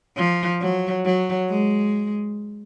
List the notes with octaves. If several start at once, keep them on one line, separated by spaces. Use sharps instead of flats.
F3
F#3
F#3
G#3